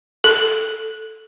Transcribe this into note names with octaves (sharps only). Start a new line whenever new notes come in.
A4